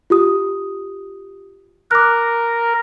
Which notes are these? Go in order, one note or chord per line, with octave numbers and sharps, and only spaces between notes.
F4 G4 D#6
A#4 D6 F#6